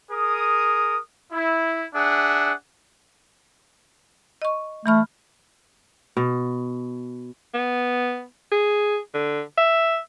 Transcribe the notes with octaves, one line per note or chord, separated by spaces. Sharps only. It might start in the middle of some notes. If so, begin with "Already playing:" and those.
G#4 A#4 D#6
E4
D4 G#4 E5 F#5
D#5 C#6
E3 A3 B5 F6
B2
B3
G#4
D3
E5